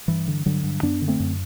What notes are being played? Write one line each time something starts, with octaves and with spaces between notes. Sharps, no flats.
G2 E3
D3
G2 D3 F#3
G2
F#2 B3 D4
D3
A3 C4
F#2